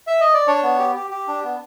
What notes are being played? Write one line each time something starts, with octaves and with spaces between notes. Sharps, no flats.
E5
D#5
D5
D4 C#5
B3
G4
G4
G4
D4
B3